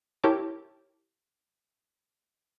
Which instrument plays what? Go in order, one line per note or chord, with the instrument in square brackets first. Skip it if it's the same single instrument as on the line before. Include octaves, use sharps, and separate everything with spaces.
[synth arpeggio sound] E4 G4 A#4 C#5 A5 D6